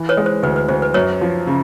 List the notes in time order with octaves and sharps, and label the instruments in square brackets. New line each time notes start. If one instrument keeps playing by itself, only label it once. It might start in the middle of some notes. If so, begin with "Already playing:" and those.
Already playing: [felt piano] E3
[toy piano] B4 C#5
[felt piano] G#3
[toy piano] C5
[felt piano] D2 [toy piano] B4
[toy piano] B4
[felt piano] D2 [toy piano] C5
[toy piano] B4
[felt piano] F#2 [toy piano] B4 C#5
[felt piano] F3
C#3